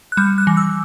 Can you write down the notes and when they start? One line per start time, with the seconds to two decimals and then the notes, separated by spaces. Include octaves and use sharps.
0.12 F#6
0.17 G3 G6
0.38 F#6
0.47 E3
0.57 E6